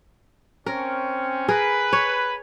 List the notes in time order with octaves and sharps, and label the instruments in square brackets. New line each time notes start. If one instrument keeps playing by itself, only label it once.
[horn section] C4 C#4 [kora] A#4
[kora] G#4 A#4 [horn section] B4
[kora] C#5